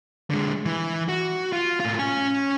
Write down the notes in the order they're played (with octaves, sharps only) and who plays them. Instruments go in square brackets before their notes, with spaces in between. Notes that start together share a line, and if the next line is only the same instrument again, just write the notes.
[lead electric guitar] D3 G#3
E3
F#4
F4
A2 F4
C#4 G#5